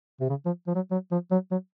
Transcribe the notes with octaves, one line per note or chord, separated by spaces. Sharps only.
C3
C#3
F3
F3
F#3
F#3
F3
F#3
F#3